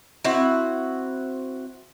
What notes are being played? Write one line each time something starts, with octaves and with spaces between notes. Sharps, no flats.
C4 E4 F#4 F#5